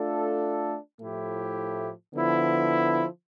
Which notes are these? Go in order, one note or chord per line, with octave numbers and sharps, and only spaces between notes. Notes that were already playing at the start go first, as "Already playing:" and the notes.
Already playing: A3 D4 F4 A4
A2 F3 A3 E4 G4
D3 F3 B3 E4